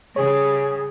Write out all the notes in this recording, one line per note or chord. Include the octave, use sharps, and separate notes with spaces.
C#3 G3 G#4 C#5